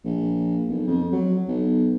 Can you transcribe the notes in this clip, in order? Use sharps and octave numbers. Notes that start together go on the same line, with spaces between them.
A#1
B1
F2
F#3
B1